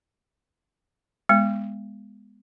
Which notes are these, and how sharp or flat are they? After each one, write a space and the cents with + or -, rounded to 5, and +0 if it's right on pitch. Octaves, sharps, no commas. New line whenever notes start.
G#3 -10 B3 +0